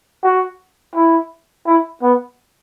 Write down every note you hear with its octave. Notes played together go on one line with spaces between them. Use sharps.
F#4
E4
E4
B3